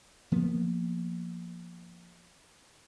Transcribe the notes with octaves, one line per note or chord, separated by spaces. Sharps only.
F3 A#3 B3